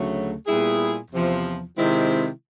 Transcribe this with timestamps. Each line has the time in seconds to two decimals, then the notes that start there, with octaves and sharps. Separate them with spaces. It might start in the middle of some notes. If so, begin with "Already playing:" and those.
Already playing: D2 C#3 F#3 A3
0.46 A#2 G3 B3 E4 G#4
1.11 E2 C3 F3
1.76 C3 D#3 G#3 C4 E4